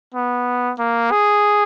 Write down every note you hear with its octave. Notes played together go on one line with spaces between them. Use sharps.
B3
A#3
G#4